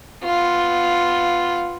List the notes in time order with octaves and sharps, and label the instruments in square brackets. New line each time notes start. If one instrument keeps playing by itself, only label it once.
[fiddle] B3 F4